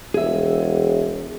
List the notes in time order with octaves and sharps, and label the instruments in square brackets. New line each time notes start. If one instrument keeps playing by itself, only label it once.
[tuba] E1 [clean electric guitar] G#4 E5